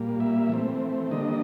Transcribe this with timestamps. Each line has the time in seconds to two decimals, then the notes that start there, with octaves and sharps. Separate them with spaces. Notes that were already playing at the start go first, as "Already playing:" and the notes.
Already playing: A#2 G3 A#3
0.20 E5
0.49 E3 A3 C4
1.11 D3 G3 A#3 D4 D#5